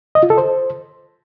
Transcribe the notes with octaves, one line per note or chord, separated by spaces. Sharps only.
D#5
F4
A4
C5